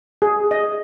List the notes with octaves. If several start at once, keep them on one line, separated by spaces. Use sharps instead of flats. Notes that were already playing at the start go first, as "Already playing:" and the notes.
G#4
D#5